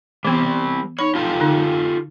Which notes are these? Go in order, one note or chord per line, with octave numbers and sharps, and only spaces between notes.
E3 G3 B3 C4
D#4 C#5 B5
F4 G4 A4
D3 D#4